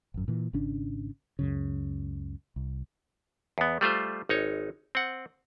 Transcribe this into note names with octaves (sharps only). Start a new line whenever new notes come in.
G#1 F#2
A#2 E3
G#1 C#3 C#4 D4
C#2 F#2 C#3
C2
E2 B3
G3 A3 F4 C5
G#1 D#4 C#5
C4 F#5